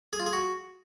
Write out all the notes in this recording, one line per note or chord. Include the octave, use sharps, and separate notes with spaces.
G#4
F4
G#4
F#4